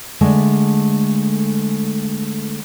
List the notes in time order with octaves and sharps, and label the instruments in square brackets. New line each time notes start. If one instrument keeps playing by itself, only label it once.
[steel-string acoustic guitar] D3 G#3 A3